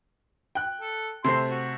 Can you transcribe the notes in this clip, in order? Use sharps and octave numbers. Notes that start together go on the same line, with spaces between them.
G5 F#6
A4
C3 A3 C4 C6
F#4